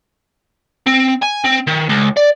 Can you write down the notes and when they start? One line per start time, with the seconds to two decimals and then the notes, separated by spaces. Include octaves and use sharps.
0.86 C4
1.22 G#5
1.44 C4
1.67 D#3
1.89 C#2
2.17 D5